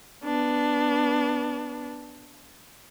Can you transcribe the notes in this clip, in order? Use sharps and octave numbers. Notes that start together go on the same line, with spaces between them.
B3 D4